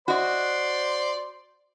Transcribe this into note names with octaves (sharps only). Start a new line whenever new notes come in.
F#4 C5 D5 D#5 C6